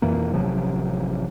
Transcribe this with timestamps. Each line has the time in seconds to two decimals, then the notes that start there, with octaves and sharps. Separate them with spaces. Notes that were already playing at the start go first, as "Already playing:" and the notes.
0.02 F2 B2 E3 A#3
0.33 A1 C3 F3 F#3